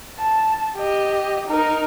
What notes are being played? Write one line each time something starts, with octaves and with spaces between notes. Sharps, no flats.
A5
G4 D#5
D#4 A#4